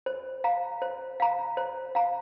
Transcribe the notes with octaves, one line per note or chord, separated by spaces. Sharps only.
C5
F5 A#5
C5
F5 A#5
C5
F5 A#5